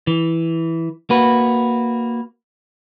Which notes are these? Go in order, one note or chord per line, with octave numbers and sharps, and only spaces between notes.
E3
A#3 F#4 B4